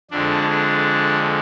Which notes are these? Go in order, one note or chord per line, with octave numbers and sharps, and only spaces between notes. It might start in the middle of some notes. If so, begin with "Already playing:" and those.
F2 D3 G#3 D4
D4